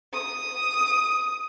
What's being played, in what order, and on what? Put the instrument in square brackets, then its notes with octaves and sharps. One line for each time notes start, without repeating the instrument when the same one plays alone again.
[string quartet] D#6